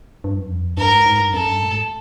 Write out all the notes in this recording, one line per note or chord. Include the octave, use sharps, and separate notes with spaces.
G2
F#2
F2
G2 A#4
G#2
G#2
G2
F#2 A4
G2
A2
G#2